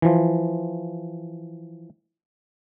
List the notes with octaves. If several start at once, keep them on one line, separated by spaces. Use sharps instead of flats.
E3 F3